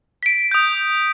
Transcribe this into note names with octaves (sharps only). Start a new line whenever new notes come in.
B6 D7
D#6 G6